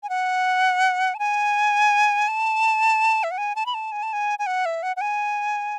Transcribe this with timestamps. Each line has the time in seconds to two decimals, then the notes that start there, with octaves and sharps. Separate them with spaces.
0.03 G#5
0.09 F#5
1.14 A5
1.19 G#5
2.28 A5
3.24 E5
3.31 F#5
3.38 G#5
3.56 A5
3.66 B5
3.74 A5
3.92 G#5
4.03 A5
4.13 G#5
4.39 G#5
4.46 F#5
4.65 E5
4.83 F#5
4.96 F#5
5.01 G#5